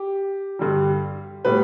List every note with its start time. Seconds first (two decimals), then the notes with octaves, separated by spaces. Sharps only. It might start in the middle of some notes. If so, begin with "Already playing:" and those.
Already playing: G4
0.59 G2 D3 G3
1.45 A2 G3 B3 B4